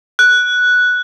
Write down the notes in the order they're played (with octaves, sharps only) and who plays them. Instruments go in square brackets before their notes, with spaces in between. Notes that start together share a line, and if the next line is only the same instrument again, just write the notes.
[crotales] F#6